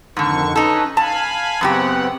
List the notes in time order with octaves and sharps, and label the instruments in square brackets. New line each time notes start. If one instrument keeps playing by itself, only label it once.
[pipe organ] F2 D#3 C#6 [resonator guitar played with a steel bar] G#2 D3
[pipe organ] C#4 B4 [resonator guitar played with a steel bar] D#4 A4
[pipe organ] F5 G#5 B5 [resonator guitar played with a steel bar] A5
[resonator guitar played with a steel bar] F#2 C#3 G4 [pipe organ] B3 C4 F#5